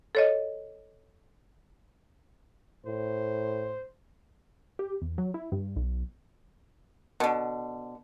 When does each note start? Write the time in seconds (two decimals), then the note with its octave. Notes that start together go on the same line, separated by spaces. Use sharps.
0.15 A4 C#5 D#5
2.86 A2 C5
4.79 G4
5.02 E2
5.18 F#3
5.34 E4
5.52 G2
5.76 B1
7.20 B2 D3